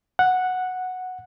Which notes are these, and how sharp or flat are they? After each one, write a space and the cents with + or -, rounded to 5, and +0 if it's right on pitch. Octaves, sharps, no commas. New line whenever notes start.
F#5 -5